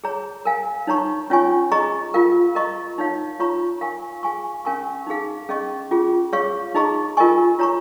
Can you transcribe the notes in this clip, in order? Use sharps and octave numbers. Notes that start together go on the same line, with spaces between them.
G#4 C#5 A#5
A#4 F5 G#5
D#4 C#5 A#5 C#6
C#4 F4 C#5 G#5 C#6
G#4 D#5 A#5 C#6
F4 A#4 F5
A#4 D#5 A#5 C#6
D#4 C#5 F5
F4 C#5 A#5 C#6
A#4 F5 G#5 C#6
G#4 F5 G#5 C#6
C#4 A#4 F5 G#5 C#6
D#4 G#4 F5
C#4 G#4 D#5 C#6
C#4 F4 G#4
G#4 C#5 F5 C#6
D#4 G#4 D#5 A#5 C#6
F4 A#4 D#5 G#5 C#6
F4 C#5 A#5 C#6